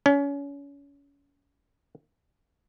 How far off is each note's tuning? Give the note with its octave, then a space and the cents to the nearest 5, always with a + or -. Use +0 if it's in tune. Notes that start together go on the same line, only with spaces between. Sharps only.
C#4 +30